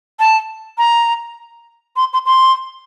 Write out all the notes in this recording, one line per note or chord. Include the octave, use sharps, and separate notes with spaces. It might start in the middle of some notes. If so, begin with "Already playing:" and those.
A5
A#5
C6
C6
C6